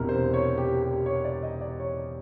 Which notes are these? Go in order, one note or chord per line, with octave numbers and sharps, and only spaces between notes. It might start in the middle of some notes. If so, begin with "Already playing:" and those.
Already playing: E1 E2 C3 E3 A#4
C5
C#5
G4
G4
C#5
D5
D#5
D5
C#5